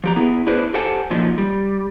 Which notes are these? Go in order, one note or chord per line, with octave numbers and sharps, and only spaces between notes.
F3 G4 A#5
B3 E4 G#4
D4 E4 G#4 B4 C5
G4 A4 C5 F#5 G#5 A5
A#2 F3 F#3 D#4
G3